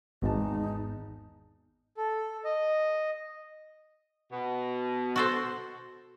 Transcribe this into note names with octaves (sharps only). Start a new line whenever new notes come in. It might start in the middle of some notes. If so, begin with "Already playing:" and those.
G#1 E2 G#3 D#4 A5
A4
D#5
B2
F#4 A4 C5